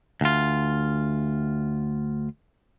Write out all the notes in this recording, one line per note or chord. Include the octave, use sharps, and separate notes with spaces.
D2 F4